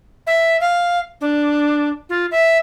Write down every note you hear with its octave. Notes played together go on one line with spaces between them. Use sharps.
E5
F5
D4
F4
E5